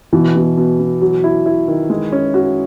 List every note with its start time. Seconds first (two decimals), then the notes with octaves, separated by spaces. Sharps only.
0.13 B2 E3
0.35 B2
0.57 B2
0.79 B2
1.01 F#3
1.24 E4
1.46 E4
1.68 D#3
1.90 G#3
2.12 C#4
2.34 F#4